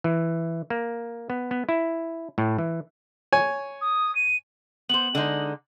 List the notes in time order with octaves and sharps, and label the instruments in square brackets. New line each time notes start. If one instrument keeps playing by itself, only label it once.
[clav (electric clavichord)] E3
A#3
B3
B3
E4
A2
E3
[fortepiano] C#5 G#5
[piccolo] D#6
D#7
[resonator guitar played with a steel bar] B3 C5 [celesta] F#7
[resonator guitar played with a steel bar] D3 G#3 D#4